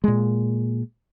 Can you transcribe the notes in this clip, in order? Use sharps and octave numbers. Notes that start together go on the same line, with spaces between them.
A#2 G#3